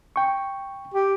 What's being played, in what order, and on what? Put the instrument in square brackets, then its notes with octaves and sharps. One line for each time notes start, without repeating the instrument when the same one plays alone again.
[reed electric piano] G5 C#6
[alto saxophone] G4